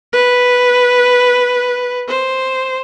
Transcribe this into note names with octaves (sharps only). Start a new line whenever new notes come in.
B4
C5